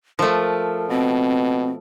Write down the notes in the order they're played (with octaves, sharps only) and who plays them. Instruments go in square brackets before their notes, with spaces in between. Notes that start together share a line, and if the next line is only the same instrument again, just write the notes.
[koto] F3 A3 [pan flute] A#4
[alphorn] B2 [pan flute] C4